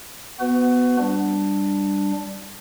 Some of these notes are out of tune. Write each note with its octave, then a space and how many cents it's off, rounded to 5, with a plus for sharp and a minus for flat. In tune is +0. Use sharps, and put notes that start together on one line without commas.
B3 +0 F#4 +0 B4 +30
G3 +0 D4 +0